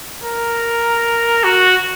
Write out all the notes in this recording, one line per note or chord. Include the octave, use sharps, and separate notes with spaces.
A#4
F#4